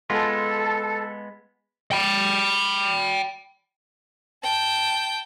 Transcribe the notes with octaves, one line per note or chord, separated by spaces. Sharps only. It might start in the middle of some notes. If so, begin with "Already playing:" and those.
G#3 B3 F4 A4
G5 B5
G5 A5